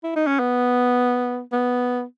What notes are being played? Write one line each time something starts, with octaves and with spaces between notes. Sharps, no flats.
E4
D#4
C#4
B3
B3